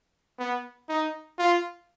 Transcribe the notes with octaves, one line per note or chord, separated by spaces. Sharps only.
B3
D#4
F4